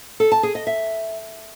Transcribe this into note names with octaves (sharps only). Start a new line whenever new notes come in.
A4
A5
G#4
D#5
E5